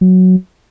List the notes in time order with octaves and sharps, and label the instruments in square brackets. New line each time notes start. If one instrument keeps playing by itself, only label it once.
[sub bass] F#3